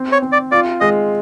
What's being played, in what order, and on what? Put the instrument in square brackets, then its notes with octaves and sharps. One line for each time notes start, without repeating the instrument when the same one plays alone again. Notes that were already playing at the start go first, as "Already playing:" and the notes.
Already playing: [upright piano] C4
[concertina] C#5
[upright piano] C4
[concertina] D5
[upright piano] F4 [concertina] D5
[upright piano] G#3 [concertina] D#5